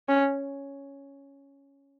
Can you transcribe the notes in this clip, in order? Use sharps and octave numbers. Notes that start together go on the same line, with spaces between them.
C#4